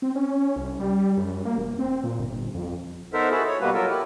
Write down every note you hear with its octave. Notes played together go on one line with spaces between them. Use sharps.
C4
C#4
C2
G3
F#2
A#3
E1
C4
A#2
G1
F2
B3 D#4 A4 A#4 C5 E5
E4 F#4 G#4 A4
C#5
B2 G3 A#3 B3 F#4 B4
F#3 F4 A4 A#4
E4 G4